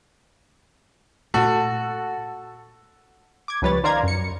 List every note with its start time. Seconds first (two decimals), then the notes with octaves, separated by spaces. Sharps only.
1.34 A#2 A3 F#4 A4
3.48 D6 G#6
3.62 C#2 F3 G3 B4 C#5 A6
3.84 D#3 C5 D5 F5 A#5 G#6
4.03 F#2 C#7